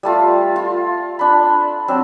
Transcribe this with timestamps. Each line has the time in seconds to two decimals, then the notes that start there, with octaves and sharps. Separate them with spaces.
0.03 G3 A3 F4
0.56 F4
1.19 D4 B5
1.88 F#3 C4 D4